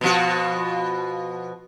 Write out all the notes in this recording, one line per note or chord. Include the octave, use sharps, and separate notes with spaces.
B2 F3 F#4